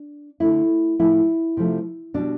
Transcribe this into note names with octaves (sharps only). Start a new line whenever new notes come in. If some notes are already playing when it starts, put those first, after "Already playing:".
Already playing: D4
D3 A3 E4
A2 F3 A3 E4
C3 F3 A3
B2 G3 D4